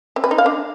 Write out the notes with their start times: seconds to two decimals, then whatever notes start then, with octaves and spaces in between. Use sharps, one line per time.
0.16 C4
0.24 B4
0.31 D#4
0.38 F5
0.46 D4